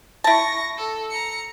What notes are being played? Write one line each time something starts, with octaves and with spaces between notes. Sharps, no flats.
E4 A5 C#6 A#6
A4
A#5 C#7